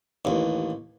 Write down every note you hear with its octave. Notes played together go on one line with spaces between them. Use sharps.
A1 D#2